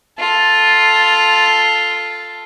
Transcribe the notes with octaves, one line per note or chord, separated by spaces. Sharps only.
F4 A4